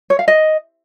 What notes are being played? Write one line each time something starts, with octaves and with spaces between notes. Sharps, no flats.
C#5
F5
D#5